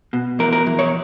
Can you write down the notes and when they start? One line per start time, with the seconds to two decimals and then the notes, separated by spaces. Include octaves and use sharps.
0.13 B2
0.39 E2 A#4
0.52 A#4
0.66 E2
0.79 C#5